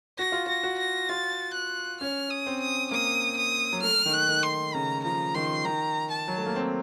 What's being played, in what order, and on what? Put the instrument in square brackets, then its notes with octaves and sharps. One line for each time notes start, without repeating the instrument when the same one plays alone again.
[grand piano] F#4 [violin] A#6
[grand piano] F4
[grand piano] F#4 [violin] A#6
[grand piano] F#4
[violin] A#6
[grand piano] F4 [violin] A6
[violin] F#6
[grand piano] C#4 [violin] F6
[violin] D#6
[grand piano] C4
[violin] D#6
[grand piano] A#3 [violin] D#6
[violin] D#6
[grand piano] F#3
[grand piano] A3 [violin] F6
[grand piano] D#3
[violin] F#6
[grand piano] D#3
[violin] C6
[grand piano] C#3 [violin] A#5
[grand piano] F3 [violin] A#5
[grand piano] D#3 [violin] C6
[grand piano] D#3 [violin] A#5
[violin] A5
[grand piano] F#3
A3
A#3
C4